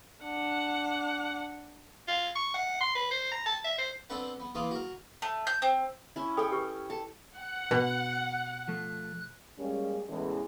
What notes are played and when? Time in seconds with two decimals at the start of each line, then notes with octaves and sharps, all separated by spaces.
0.24 D4 F#5
2.08 F4
2.35 C#6
2.54 F#5
2.80 C6
2.95 B4
3.11 C5
3.32 A#5
3.46 A5
3.64 E5
3.78 C5
4.10 B3 C4 D4 A4 B4 F#5
4.40 B3
4.55 E3 A#3 B3 F4 D6 D#6
4.71 F#4 A#4
5.22 A3
5.47 G6
5.62 C4
6.16 C#4 E4
6.37 A4 C#5 G5 G#5 D#6
6.52 G4 B4 C#6
6.90 A4
7.37 F#5
7.71 B2 F#6
8.68 F3 A3
9.58 G3 G#3 A#3 C#4
10.08 E2 A2 E3 G#3 C#4 A4